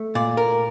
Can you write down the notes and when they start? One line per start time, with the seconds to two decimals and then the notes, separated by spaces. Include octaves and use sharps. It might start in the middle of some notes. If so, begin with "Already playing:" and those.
Already playing: A3
0.15 A#2 D5
0.37 A#4